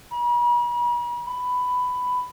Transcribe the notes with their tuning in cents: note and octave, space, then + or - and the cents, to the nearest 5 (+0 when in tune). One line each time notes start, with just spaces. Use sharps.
B5 -45
B5 +10